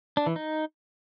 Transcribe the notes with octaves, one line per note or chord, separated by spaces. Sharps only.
D4
E3
D#4